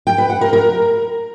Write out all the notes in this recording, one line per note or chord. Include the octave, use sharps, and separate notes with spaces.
G5
B4
F#5
A#4
A#4